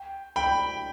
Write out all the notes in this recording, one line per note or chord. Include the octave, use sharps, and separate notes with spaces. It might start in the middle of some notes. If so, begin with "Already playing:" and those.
Already playing: G5
G5 B5